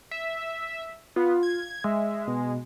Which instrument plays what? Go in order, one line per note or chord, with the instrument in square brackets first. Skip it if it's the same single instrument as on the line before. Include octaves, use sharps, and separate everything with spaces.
[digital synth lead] E5
[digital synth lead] B3 [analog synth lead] F4
[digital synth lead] G#6
[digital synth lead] G#3 [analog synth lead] E5
[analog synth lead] B2